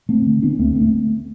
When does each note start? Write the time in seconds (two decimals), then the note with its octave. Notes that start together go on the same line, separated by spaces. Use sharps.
0.09 A3 C4
0.26 D3
0.43 B3 D4
0.59 D2 A3 C4
0.75 B3
0.81 A3